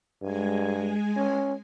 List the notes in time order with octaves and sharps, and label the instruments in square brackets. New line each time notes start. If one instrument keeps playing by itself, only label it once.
[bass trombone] G2 [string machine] G#3 G#5
[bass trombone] C#4